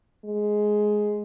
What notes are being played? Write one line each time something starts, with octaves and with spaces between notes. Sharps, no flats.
G#3